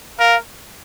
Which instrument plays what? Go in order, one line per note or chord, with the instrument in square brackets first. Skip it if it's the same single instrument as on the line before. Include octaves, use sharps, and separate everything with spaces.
[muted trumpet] A#4 [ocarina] F5